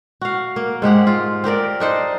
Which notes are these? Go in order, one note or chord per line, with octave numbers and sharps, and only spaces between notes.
F#4 F5
A#3
G#2 G#3 G4 F#5
F4
C4 G4 A#4 D5
D4 D#4 C5 D5